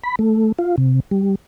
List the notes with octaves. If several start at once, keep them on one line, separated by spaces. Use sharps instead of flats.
B5
A3
F4
C3
G3